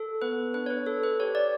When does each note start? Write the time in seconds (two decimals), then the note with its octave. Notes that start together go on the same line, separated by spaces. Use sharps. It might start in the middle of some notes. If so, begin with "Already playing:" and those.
Already playing: A4
0.22 B3 B4
0.54 D4 B4
0.66 C#5
0.70 B4
0.86 A4
1.03 B4
1.20 G4 C#5
1.35 D5